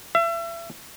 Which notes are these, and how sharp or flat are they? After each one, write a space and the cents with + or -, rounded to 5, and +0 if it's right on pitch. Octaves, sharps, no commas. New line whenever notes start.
E5 +35